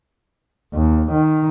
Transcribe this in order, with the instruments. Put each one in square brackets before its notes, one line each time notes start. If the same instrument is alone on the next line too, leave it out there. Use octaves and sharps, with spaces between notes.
[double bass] D#2
D#3